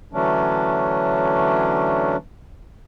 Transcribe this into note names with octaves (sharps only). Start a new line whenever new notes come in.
D3 E3 F#3 A3 C#4 D4